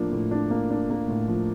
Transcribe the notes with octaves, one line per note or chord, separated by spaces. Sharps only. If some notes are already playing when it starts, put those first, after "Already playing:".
Already playing: A2 F3 A#3 D4
A2
D4
A#3
D4
A#3
A2
F3